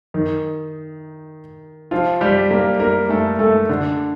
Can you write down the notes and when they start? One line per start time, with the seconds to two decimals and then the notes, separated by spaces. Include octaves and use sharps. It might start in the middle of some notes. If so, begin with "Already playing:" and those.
0.14 D#3 D#4
1.91 F3 F4
2.21 G3 G4
2.50 A#3 A#4
2.80 A#3 A#4
3.09 A3 A4
3.39 A3 A4
3.69 D3 D4